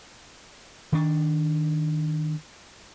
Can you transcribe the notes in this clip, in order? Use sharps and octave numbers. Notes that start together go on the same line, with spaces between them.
D#3 D4